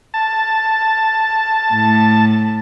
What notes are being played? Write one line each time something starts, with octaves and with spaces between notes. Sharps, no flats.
A5
A2